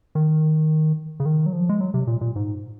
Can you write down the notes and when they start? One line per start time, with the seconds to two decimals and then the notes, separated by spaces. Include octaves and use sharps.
0.15 D#3
1.20 C#3
1.26 D#3
1.46 F#3
1.53 F3
1.69 G#3
1.81 F#3
1.94 C3
2.07 A#2
2.21 A#2
2.36 G#2